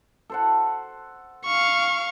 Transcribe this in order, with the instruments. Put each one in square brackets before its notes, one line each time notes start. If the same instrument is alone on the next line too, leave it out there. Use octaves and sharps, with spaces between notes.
[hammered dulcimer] A4 C5 F#5
[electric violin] F5 C#6